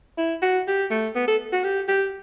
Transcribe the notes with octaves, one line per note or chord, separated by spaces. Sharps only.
E4
F#4
G4
A3
B3
A4
F#4
G4
G4